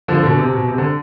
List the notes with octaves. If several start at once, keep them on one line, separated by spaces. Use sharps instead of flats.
D3 F3
B2 D3
C3
B2
C3
D3